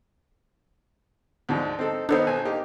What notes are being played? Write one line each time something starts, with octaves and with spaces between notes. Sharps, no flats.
D2 G#2 F3
C4 D#4 A4
D#3 B3 D4 D#4 A4 C5
B1 G#5
A#3 D#4 G4